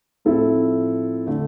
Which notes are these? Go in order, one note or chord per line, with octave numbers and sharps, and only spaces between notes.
A2 F3 C4 E4 A4
D3 A3